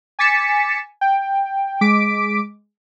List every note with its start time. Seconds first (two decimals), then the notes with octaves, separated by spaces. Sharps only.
0.19 G#5 D6 A6 B6 C#7 E7
1.01 G5
1.81 G#3 D6 B6 D7